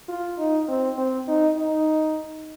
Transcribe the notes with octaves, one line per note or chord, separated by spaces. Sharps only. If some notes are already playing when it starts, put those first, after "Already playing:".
F4
D#4
C4
C4
D#4
D#4